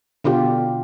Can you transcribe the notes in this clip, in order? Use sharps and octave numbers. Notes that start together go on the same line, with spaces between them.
B2 D3 F4 G4